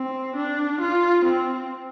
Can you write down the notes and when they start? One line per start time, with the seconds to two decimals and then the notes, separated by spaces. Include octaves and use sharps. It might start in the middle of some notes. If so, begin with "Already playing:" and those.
Already playing: C4
0.36 D4
0.81 F4
1.25 C4